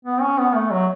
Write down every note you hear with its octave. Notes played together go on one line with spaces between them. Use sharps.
B3
C#4
B3
A3
F#3